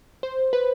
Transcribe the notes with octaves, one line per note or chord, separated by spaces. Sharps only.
C5
B4